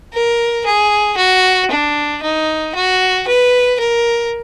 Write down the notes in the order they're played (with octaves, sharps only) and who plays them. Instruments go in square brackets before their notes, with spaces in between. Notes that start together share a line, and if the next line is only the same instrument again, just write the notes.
[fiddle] A#4
G#4
F#4
D4
D#4
F#4
B4
A#4